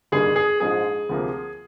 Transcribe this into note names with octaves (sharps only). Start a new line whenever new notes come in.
G1 G2 D#3 A#3 G#4
G#4
A#1 G#2 F3 G#3 G#4
D2 C3 F3 A#3